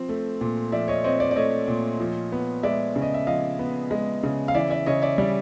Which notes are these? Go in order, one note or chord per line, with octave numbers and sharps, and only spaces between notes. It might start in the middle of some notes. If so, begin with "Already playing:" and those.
Already playing: F3 C4
A3
A#2
F3 D5 E5
C#5 D#5
C4 C#5 D#5
C5 D5
D5
A3 C#5 D#5
A#2
F3
B3
G#3 D5 E5
C#3
D#5
E5
F3 D#5 F5
B3
G#3
C#3
F5
E3 D5 E5
D5 E5
C#3 C#5 D#5
D5 E5
G3 D5 E5